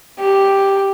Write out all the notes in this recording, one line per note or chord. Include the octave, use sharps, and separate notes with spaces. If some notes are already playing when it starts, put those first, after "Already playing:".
G4